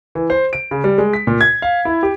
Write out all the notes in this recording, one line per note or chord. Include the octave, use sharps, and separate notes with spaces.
E3
C5
D7
C#3
G3
G#3
B6
A#2
G#6
F5
E4
G4